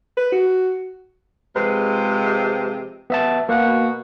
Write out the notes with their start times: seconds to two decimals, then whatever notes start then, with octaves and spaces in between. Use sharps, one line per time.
0.17 B4
0.32 F#4
1.56 C3 F3 G#3 B4
3.10 B3 E5 A5
3.49 B2 A#3 F#4